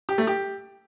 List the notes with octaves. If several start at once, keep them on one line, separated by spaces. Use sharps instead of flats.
G4
A3
G4